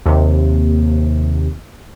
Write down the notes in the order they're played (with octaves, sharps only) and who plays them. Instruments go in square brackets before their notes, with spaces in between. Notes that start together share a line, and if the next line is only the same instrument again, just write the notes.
[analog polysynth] D#2 C3